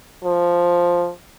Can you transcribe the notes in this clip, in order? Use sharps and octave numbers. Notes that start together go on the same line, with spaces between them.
F3